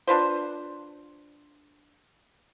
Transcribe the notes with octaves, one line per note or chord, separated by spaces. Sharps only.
D4 F4 B4 C5